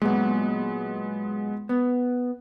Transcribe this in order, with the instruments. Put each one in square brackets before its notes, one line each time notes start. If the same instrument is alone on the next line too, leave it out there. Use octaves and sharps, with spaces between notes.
[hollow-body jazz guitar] A#2 F#3 [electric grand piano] G#3 B3
[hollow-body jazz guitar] B3